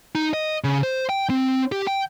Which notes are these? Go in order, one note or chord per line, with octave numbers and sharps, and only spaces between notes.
D#4
D#5
C#3
C5
G5
C4
G4
G5